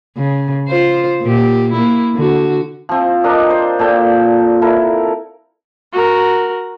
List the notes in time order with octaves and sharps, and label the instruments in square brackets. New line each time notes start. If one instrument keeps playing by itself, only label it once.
[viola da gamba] C#3
F4 C5
A#2 G4
A#3 E4
D3 F#4
[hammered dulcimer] F3 C4
D4 A#4 D#5
C5
A#2 A4 G5
E4 A4 A#4
[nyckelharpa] F#4 A#4